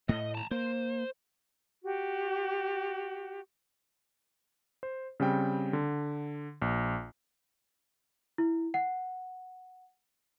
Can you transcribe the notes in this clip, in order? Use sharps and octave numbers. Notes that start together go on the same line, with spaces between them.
A2 A3 D#5
A5 A#5
A#3 C5
F#4 G4
C5
C#3 G3 C4 G5
D3
A#1
E4
F#5